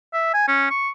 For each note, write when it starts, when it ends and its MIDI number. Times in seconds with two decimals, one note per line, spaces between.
0.14 0.30 76
0.34 0.44 80
0.48 0.68 61
0.70 0.89 85